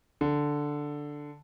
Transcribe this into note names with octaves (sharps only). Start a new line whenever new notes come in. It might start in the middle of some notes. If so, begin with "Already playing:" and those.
D3